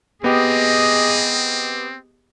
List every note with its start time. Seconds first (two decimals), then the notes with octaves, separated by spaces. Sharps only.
0.24 B3 C4 G4 G#4 D#5